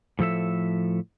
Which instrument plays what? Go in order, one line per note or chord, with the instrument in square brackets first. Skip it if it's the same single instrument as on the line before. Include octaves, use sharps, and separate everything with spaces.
[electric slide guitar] A2 F3 A4 E5